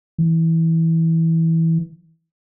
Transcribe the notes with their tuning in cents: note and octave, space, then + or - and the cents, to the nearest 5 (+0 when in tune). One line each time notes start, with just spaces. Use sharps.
E3 -15